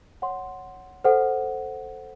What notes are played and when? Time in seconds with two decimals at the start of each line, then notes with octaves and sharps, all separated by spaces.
0.22 C#5 F#5 C6
1.04 A4 C5 F#5